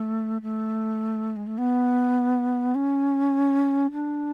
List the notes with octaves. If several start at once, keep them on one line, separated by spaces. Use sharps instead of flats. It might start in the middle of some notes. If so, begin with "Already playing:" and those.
Already playing: A3
A3
G#3
A3
B3
C#4
D4